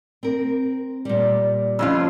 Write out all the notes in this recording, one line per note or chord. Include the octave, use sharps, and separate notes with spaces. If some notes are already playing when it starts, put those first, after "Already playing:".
C4 A#4
A#2 G3
F2 C#4 F4